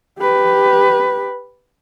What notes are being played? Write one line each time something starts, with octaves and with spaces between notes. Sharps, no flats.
G4 B4